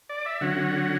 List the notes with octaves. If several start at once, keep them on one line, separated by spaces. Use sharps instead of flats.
D5
E5
D3 F#3 C#4 F#5